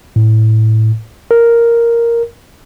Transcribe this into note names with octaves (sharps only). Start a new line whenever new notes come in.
A2
A#4